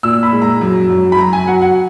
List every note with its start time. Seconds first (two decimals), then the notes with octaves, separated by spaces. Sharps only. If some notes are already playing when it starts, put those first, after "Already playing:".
0.03 A#2 E6
0.23 B5
0.32 G#3
0.42 A#5
0.61 F#2
0.90 F#2
1.12 B5
1.18 F#3 A#5
1.33 G#5
1.47 F#3 F#5
1.61 F#5